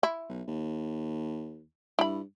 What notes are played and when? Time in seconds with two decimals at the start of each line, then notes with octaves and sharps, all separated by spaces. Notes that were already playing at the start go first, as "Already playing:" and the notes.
0.03 E4
0.29 B1
0.48 D#2
1.99 G2 E4 B5